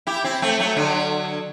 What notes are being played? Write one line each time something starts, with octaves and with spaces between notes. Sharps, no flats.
E4 G4
C4 E4
A3 C4
F#3 A3
D3 F#3